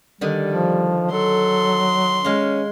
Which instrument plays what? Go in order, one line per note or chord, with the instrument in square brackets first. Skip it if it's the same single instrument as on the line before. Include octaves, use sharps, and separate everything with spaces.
[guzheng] D3 D#3 [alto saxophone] G3
[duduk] F3
[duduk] F#3 [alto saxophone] A4 [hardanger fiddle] C6
[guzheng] G#3 F5 [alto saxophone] C#4